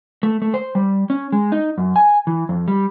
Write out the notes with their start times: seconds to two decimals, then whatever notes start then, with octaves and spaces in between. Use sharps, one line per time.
0.23 A3
0.42 A3
0.54 C5
0.75 G3
1.10 C#4
1.32 G#3
1.52 D#4
1.78 F#2
1.96 G#5
2.27 E3
2.49 F2
2.68 G3